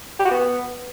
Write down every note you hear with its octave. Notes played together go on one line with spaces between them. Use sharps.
G4
F#4
B3